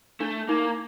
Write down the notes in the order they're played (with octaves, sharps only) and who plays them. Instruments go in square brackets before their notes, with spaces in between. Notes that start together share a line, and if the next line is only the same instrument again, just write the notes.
[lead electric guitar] A3 [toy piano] D4
[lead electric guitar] A#3 [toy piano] D#4